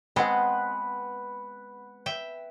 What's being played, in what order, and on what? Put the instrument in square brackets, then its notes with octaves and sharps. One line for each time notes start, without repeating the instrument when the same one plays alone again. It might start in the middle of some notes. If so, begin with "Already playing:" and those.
[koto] G#3 B3 C4 [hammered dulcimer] B4 F#5
[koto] E5 G5